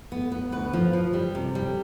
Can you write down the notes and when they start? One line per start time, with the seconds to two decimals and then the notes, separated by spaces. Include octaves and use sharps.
0.12 B3
0.32 B3
0.52 D2 B4
0.73 F3
0.93 F3
1.13 G3
1.35 C3
1.55 G3